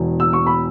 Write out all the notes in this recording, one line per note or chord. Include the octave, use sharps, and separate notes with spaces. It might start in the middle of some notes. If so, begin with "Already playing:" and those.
Already playing: E1 E2 E3
E6
C#6
B5